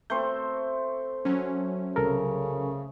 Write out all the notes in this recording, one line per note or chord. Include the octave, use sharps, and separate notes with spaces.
A3 C4 C5 G6
F#3 C#4
C2 C#3 A4 A#4